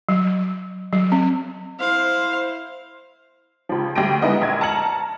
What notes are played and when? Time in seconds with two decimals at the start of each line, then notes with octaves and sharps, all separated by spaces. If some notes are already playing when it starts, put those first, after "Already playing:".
0.09 F#3
0.93 F#3
1.12 C4
1.80 E4 C5 F5
3.69 C#2 F3
3.95 D2 G3 G4 G5 A#6 D7
4.22 G#3 B3 E4 A#4 D#5 F#5
4.42 A#1 G#6
4.61 A5 A#5 F6 C#7 F#7